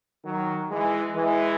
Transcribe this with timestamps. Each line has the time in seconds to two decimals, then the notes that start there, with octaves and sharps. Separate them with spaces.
0.25 D#3 F#3
0.70 E3 G#3
1.15 E3 G#3